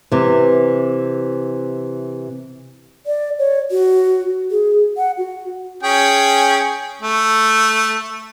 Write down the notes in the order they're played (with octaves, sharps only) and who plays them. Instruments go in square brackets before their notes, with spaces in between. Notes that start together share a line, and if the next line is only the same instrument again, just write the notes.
[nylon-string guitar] C3 E3
[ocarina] D5
C#5
F#4
G#4
F#5
F#4
[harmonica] C#4 G#4 G5
A3